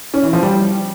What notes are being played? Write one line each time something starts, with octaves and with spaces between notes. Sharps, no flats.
C#4
E3
F3
G3